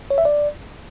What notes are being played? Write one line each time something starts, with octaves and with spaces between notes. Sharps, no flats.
C#5
E5
D5